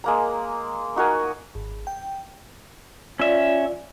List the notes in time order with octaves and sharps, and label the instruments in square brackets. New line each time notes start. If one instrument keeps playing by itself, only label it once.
[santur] G#3 A#3 A#5
D#4 F#4 A#4 G#5
[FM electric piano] G#1
G5
[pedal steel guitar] C#4 E5 [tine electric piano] F4 D5